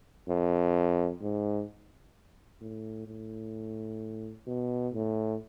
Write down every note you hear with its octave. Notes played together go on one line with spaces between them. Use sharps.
F2
G#2
A2
A2
B2
A2